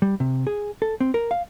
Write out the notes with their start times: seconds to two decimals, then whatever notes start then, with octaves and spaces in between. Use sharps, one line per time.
0.02 G3
0.20 C3
0.47 G#4
0.82 A4
1.00 C4
1.14 A#4
1.31 F5